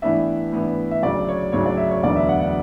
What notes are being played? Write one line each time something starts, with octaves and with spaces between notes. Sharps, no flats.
A2 E3 B3 D4 E5
A2 E3 B3 D4
E5
D2 C#3 F#3 D5
C#5
D2 C#3 F#3 C#5
D5
E5
C#5
E1 D2 D3 F#3 B3 D5
E5
F#5
F#5